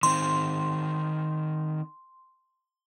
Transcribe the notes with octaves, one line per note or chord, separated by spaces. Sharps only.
D#3 C4 C6